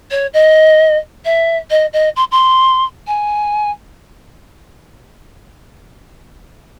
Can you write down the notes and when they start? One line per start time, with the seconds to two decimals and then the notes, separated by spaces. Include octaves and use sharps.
0.10 C#5
0.33 D#5
1.25 E5
1.70 D#5
1.93 D#5
2.16 C6
2.31 C6
3.07 G#5